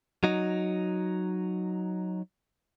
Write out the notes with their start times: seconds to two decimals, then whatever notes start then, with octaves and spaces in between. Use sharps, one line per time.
0.24 F#3 D#4